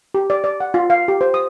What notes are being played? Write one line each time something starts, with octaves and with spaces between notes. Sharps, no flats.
G4
D5
D5
F#5
F4
F5
G4
C5
D#6